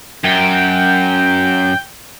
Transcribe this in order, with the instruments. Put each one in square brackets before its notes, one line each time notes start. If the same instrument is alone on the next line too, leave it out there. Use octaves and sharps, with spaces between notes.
[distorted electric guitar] F#2 [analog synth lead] G5